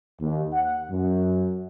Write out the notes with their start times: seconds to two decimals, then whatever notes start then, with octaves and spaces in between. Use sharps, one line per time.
0.20 D#2
0.53 F#5
0.89 F#2